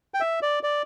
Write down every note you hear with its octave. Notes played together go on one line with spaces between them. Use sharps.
G5
E5
D5
D5